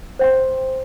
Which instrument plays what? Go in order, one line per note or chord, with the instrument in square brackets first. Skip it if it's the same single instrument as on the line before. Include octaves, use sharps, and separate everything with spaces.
[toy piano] C5 G5 C6